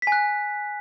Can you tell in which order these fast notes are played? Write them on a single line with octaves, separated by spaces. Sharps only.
B6 G#5 F#6